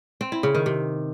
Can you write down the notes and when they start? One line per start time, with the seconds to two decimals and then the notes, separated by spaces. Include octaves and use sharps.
0.21 C4
0.32 E4
0.43 C#3
0.55 D#3
0.66 C3